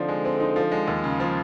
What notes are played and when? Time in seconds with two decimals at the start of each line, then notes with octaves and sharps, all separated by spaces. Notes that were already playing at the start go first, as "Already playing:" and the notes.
Already playing: D3 F3 C4 D#4
0.08 G#3
0.25 C4
0.40 D#4
0.56 F3
0.72 G#3
0.88 D#2
1.04 C#3
1.20 F3